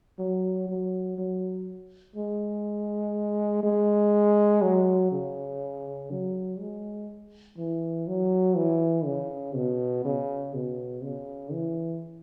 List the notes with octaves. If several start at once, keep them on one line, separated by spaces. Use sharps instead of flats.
F#3
F#3
F#3
G#3
G#3
F#3
C#3
F#3
G#3
E3
F#3
E3
C#3
B2
C#3
B2
C#3
E3